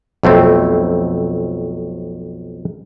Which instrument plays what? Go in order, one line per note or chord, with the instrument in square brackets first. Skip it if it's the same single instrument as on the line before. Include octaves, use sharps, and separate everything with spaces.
[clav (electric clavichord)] B1 F2 A3 C4